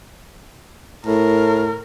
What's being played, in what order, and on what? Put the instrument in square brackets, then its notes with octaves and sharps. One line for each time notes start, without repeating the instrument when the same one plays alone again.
[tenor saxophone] A2 [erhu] A#4